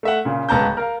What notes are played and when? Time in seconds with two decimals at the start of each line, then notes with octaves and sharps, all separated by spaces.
0.03 A3 E5 F#5
0.25 A#2 C#3
0.49 D1 C#2 B3 A5 A#5 G6
0.77 A#4 F5